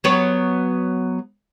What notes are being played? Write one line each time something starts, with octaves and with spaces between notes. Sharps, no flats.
F#3 B3 C#5